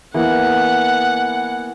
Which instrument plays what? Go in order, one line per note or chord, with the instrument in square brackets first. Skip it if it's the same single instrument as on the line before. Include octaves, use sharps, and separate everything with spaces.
[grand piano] E3 A#3 B3 [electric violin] F#5